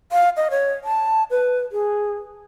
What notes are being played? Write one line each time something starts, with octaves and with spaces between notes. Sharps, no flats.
F5
D#5
C#5
A5
B4
G#4